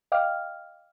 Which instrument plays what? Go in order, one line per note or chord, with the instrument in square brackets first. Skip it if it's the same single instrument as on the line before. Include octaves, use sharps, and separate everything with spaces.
[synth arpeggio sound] D#5 F5 G5 D6 F6